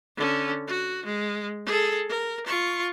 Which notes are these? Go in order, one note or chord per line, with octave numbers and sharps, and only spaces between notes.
D3 C#4
F#4
G#3
G#4 A4
A#4
F4 C#6